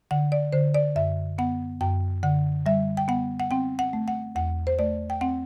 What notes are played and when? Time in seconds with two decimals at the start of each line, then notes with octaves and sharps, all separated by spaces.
0.11 D3 F#5
0.32 D5
0.52 D3 C5
0.74 D5
0.95 F#2 E5
1.38 B3 F#5
1.81 F#2 G5
2.23 D3 F#5
2.66 G3 E5
2.97 G5
3.08 B3 F#5
3.40 F#5
3.51 C4 G5
3.79 F#5
3.93 A3
4.08 F#5
4.35 E2 F#5
4.67 C5
4.79 A3 D5
5.10 G5
5.21 C4 F#5